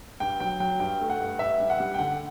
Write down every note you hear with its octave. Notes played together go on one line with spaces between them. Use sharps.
G2 G5
F#3 G5
F#3 G5
G2 G5
A3
F#5
G2
G2 E5
G2
F#5
G3
G5
D3 F#5